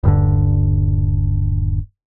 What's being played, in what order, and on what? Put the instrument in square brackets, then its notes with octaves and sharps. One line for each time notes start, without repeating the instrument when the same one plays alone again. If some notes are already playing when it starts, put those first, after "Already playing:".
[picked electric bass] D#1 G2 D3